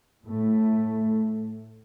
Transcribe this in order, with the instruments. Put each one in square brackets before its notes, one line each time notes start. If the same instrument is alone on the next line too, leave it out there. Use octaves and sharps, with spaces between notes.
[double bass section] A2 A3